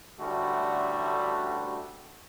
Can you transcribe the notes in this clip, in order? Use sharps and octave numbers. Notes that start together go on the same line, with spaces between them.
A1 D2 D3 G3 A3 F#4